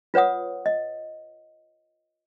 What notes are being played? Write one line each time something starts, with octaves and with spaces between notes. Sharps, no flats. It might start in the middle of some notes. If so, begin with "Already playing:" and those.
F4 B4 C#5 F#5 D#6
D#5